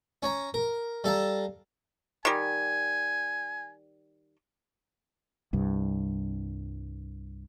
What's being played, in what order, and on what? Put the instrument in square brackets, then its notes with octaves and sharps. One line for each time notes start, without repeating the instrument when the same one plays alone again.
[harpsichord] C#4 C#5 A#5
A#4
G3 A4 F5 A#5
[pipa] D#3 G3 [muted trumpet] G#5
[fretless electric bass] C2 G2